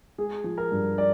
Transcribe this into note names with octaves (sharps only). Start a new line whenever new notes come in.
G#3 G#4
F3
A#4
G2
D5